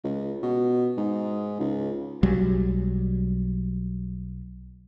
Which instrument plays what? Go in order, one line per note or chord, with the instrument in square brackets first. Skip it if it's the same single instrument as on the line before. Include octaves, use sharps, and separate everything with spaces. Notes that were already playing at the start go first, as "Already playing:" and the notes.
[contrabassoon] C#2
B2
G#2
C#2
[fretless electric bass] B1 F#3 G3